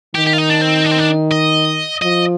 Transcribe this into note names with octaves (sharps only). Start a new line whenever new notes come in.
D#3 G4
G4
F4
D#4
D4
C4
D4
C4
D4
D#5
F3 D#5